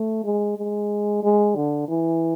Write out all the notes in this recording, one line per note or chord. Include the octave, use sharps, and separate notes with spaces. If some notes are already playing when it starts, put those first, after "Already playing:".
Already playing: A3
G#3
G#3
G#3
D3
E3